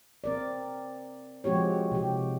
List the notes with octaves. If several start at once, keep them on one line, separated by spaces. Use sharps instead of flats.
C4 A#4 D5
F3 G#3 C4 F#4 G4 C#5
C3 E3 G4